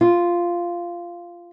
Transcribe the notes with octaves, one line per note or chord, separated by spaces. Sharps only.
F4